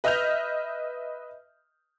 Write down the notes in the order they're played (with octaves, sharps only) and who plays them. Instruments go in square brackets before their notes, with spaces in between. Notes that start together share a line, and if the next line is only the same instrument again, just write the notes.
[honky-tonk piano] B4 D#5 E5 F6 G6 F7